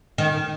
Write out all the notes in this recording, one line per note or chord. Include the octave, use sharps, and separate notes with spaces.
D#3